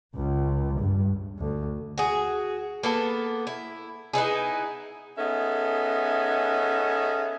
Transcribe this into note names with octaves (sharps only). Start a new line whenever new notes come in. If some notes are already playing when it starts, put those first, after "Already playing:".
C#2
G2
D2
F#4 G#4
A#3 B3 A4
E4
B3 D#4 E4 G#4
B3 C#4 D#4 G#4 A4 E5